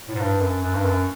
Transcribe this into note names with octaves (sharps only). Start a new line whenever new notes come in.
A2
G#2
G2
F#2
F#2
G2
F#2